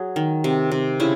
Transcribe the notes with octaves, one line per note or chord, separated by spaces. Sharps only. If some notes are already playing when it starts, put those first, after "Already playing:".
Already playing: F#3 G#4
D#3
C3
C3
C#3 E4